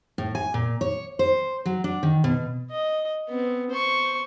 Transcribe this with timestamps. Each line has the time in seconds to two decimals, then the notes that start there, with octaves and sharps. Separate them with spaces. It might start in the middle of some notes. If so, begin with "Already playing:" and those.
0.18 A2
0.35 G#5
0.54 A#2
0.81 C#5
1.19 C5
1.66 F#3
1.84 D4
2.03 D#3
2.24 B2
2.71 D#5
3.29 B3 C4
3.70 C5 C#6